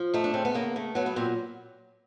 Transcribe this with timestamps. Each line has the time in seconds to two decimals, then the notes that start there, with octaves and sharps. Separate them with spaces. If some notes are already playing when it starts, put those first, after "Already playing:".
Already playing: F3
0.14 A3 D#4
0.24 D4
0.34 C#3 C4
0.45 B3
0.54 C#3 A#3
0.76 A3
0.95 F#3 B3
1.06 B3
1.16 A#2 C4